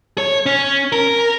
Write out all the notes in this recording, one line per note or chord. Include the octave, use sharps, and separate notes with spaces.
C#5
C#4
A#4